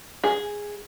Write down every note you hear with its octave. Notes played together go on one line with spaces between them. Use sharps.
G#4